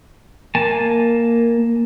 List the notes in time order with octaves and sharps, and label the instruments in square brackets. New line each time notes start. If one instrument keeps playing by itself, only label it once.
[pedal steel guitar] A#3 G#5 A5